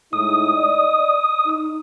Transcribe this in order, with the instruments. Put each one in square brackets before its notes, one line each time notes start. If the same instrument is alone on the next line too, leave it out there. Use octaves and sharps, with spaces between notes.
[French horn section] A2 G#3 D#4 [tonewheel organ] D#6
[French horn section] D5 D#5
D#4